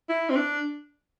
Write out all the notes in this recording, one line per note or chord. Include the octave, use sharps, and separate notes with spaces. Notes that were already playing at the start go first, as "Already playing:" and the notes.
E4
C4
D4